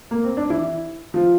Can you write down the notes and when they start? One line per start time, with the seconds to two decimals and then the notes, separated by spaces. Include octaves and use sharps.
0.11 A#3
0.24 C4
0.37 D4
0.50 E3 E4
1.14 F3 F4